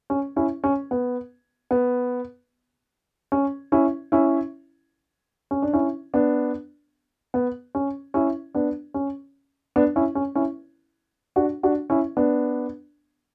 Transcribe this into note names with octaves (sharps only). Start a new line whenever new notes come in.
C#4
C#4 E4
C#4
B3
B3
C#4
C#4 E4
C#4 E4
C#4
D4
C#4 E4
B3 D4
B3
C#4
C#4 E4
B3 D4
C#4
B3 D4
C#4 E4
C#4
C#4 E4
D4 F#4
D4 F#4
C#4 E4
B3 D4